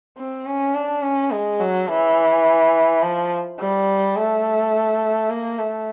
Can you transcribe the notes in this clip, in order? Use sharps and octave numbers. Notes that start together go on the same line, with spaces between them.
C4
C#4
D4
C#4
G#3
F#3
E3
F3
G3
A3
A#3
A3